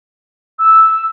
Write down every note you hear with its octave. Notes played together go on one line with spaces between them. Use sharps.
E6